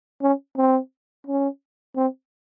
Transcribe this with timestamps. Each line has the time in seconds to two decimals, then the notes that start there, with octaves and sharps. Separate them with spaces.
0.22 C#4
0.57 C4
1.27 C#4
1.96 C4